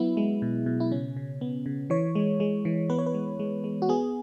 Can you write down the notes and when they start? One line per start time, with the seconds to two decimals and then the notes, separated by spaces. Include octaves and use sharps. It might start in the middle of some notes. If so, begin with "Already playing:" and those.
Already playing: F#3 B3 E4
0.17 G#3
0.42 B2
0.66 B2
0.80 E4
0.91 C#3 C#4
1.16 C#3
1.41 B3
1.66 C#3
1.90 E3 C#5
2.15 G#3
2.40 G#3
2.65 E3
2.90 B3 B4
2.98 C#5
3.06 B4
3.14 G#3
3.39 G#3
3.64 G#3
3.82 F#4
3.89 B3 G#4